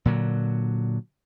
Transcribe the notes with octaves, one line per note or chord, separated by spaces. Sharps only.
A#2 D3 F#3